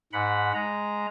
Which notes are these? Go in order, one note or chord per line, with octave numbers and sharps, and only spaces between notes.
G#2 F#5 B5
G#3 A#5